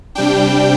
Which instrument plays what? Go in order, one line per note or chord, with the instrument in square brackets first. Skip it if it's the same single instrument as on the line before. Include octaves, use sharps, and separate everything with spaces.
[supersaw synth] C3 G3 D4 G5